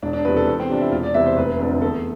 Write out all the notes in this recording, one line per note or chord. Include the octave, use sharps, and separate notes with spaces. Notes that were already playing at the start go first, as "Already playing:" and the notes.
E1 D4
D4
E2 C3 F3 B4
A4
E2
C4
C3 F3 D4
E4
E1 F4
D5
E2 C3 E3 E5
C5
F1 B4
F2 D3 F3
E2 A4